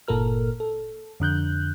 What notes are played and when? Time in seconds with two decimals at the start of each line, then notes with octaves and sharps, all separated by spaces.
0.08 G1 A#2 A4 A#4 F6
0.60 A4
1.20 F2 D3 F#6 G6